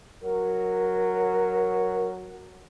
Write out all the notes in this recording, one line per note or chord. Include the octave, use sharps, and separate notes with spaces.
F#3 A#4